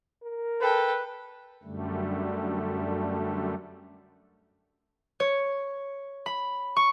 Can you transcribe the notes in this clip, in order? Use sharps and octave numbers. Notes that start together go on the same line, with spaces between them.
A#4
A4 B4 G5
F#2 D3 G3 A3
C#5
B5
C#6